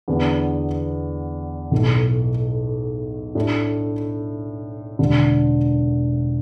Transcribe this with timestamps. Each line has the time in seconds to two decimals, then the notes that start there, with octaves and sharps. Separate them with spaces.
0.08 E2 D3 B3 D4
1.71 B1 A2 A3
3.35 A2 A3 D4
4.99 E1 D2 D3